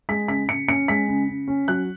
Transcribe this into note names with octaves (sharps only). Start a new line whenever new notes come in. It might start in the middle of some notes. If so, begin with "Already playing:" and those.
G#3 B6
C#3 B6
C#3 C#7
C#4 C#7
G#3 B6
C#3
C#3
C#4
F#3 F#6